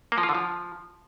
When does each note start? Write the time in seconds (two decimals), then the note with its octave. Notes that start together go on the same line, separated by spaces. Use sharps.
0.12 A#3
0.18 F3
0.23 F4
0.29 D3
0.35 F3